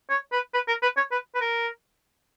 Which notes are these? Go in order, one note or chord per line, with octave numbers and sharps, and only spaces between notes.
C#5
B4
B4
A#4
B4
C#5
B4
B4
A#4